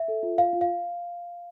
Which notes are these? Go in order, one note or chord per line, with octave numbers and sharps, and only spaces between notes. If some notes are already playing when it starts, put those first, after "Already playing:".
Already playing: E5
A4
F4
F4 F5
F4
F5